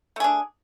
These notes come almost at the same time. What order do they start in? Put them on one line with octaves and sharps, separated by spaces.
A3 G#4 D4